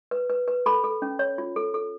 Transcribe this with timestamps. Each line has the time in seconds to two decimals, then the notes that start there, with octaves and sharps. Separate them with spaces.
0.11 B4
0.30 B4
0.48 B4
0.66 A4 B5
0.84 A4
1.02 C#4
1.19 C#5
1.38 F4
1.56 A4
1.74 A4